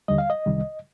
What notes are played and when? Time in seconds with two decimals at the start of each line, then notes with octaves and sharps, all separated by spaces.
0.08 D#2 D3 G3 D#5
0.18 F5
0.30 D#5
0.46 C2 C3 D#3 G3